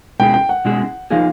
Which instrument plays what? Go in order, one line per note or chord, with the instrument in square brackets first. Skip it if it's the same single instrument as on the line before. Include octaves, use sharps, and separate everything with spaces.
[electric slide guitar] B2 G#3 C#4 E4 G#4 [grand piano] G5
[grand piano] G5
F#5
[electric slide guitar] B2 G#3 C#4 E4 G#4
[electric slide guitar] F3 A#3 D#4 G#4 [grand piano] F5